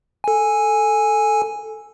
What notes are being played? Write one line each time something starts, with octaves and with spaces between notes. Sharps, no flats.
A4 G#5